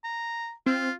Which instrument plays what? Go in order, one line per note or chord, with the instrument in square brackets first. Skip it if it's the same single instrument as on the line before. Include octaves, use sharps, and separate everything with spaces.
[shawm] A#5
[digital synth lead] C4 [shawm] F4